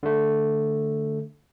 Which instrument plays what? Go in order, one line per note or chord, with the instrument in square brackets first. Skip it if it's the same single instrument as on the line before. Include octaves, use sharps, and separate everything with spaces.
[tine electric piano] D3 A3